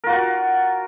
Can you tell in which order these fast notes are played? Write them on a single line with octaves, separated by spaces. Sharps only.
A#4 F4 F#4